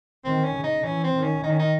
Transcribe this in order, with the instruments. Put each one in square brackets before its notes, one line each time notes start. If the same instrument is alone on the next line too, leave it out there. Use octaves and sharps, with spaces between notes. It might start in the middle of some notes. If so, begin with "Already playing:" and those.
[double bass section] D#3 [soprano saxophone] C4
[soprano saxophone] C#4
[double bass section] C#3
[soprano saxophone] D#4
[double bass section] E3 [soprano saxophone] C#4
[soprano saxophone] C4
[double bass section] D#3
[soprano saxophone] C#4
[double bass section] D#3 [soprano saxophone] D#4
[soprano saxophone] C#4
D#4